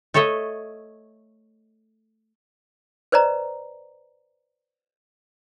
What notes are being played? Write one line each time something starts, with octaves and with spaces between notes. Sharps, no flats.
A3 A4 C#5 D#5 E5
B4 C5 D5 D#5 A#5